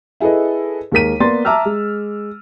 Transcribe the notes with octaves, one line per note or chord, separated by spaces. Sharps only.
E4 G#4 A4 B4 D#5
D#2 G#3 A#4 B6 D#7
A#3 B3 D5 C6 A6
E5 A5 A#5 D6 E6 F6
G#3